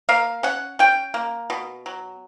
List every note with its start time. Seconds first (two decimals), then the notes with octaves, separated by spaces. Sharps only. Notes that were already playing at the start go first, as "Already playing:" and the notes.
0.09 A#3 F5
0.43 C#4 F#5
0.79 C#4 G5
1.14 A#3
1.50 B2
1.86 F#3